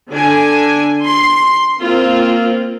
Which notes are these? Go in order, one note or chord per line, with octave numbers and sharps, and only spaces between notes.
D3 D4 G#5
C6
A#3 C4 F4